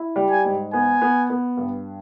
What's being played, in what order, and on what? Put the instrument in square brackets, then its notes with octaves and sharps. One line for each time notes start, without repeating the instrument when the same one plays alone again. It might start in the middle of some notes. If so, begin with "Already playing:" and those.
Already playing: [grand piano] E4
G3
[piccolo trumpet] G#5
[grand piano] G#2
[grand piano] B3 [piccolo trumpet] G#5
[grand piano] B3
B3
G2